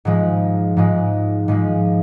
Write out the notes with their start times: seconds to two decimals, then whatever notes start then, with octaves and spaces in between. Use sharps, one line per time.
0.05 G#2 F3 G#3
0.77 G#2 F3 G#3
1.48 G#2 F3 G#3